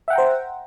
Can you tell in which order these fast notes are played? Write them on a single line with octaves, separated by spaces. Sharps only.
E5 F#5 G5 A#5 C5